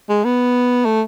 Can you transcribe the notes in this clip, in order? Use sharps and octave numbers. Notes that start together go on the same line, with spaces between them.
G#3
B3
A3